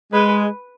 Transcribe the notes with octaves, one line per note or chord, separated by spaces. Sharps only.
G#3 B4